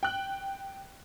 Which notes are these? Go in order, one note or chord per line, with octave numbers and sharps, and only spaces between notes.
G5 F#6